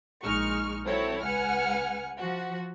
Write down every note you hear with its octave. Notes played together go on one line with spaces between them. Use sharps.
A#1 G#3 D#4 C#6 F6
F#3 C4 E4 A4 C#5
C#2 B4 F#5 G#5 F6 C#7
F3 F#4